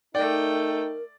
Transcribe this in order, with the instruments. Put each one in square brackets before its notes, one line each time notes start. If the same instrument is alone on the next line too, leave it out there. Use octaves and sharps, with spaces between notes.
[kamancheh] A3 G5 [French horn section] D#4 [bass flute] A#4 [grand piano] D5